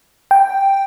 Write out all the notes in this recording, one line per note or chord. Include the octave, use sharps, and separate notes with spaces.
G5